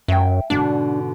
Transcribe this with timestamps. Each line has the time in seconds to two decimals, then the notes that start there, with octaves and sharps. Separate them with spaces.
0.08 F#2 E5 G5
0.50 G#2 B2 D3 D4